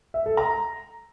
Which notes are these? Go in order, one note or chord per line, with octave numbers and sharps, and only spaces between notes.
E5
A4
A#5